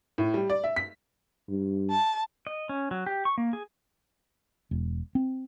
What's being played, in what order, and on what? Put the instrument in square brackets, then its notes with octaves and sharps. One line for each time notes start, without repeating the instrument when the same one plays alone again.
[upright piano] A2
G3
D5
E5
B6
[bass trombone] G2
[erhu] A5
[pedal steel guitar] D#5
C#4
F#3
G4
C#6
A#3
G#4
[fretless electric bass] E1
C4